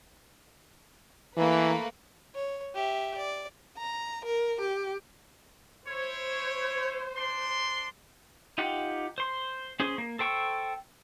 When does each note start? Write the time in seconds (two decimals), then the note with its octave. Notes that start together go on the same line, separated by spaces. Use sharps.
1.37 E3 A3 A#3 B4
2.34 C#5
2.75 G4 E5
3.17 D5
3.78 A#5
4.26 A#4
4.60 G4
5.88 E4 C5 C#5
7.16 D4 C6
8.58 D#4 F4 G4 F#5
9.18 C5 C6
9.80 C#4 G#4 C5
9.98 A#3
10.19 A4 C5 G5 C#6 E6